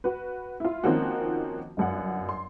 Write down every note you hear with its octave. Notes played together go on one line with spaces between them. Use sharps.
F#4 B4
E4 F4
D#3 F3 A#3 C4 C#4 F#4
G1 F#2 F#5
C6